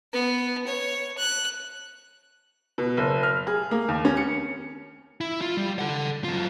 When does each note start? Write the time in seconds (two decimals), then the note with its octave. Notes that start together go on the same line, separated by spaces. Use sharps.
0.13 B3
0.67 C#5
1.18 F#6
2.78 B2
2.97 F#1
3.23 F6
3.47 G#4
3.71 A#3
3.88 D#2
4.05 C#4
4.17 C#7
5.21 E4
5.41 F4
5.57 G3
5.79 A4 F#5
6.24 F#2 F4